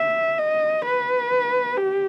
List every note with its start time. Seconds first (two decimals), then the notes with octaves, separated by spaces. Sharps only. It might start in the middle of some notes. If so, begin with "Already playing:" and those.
Already playing: E5
0.39 D#5
0.85 B4
1.78 G4